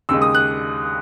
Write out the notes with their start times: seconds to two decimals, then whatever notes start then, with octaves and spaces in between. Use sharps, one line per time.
0.09 D#2 C#3 G#3 E6
0.22 D#6
0.35 F#6